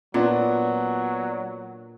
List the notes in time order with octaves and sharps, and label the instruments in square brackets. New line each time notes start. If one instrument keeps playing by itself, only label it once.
[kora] A#2 [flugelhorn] F#3 [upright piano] B3 D4